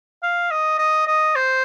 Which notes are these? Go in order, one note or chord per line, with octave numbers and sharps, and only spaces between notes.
F5
D#5
D#5
D#5
C5